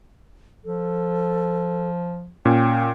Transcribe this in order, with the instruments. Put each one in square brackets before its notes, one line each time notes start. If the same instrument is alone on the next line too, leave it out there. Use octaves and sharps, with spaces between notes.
[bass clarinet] F3 [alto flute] A4
[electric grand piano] A#2 C#4 [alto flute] G5